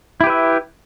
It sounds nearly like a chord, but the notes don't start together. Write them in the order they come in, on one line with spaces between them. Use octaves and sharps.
E4 G4 B4 E5